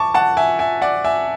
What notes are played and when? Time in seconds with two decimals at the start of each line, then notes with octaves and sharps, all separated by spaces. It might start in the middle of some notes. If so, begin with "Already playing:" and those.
Already playing: A5 C#6 D6
0.14 F#5 A5
0.37 E5 G#5
0.59 E5 G#5
0.82 D5 F#5
1.04 E5 G#5